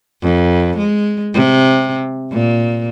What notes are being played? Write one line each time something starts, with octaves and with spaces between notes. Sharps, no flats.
F2
G#3
C3
A#2